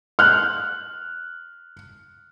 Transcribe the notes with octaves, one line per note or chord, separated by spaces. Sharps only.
F6 F#6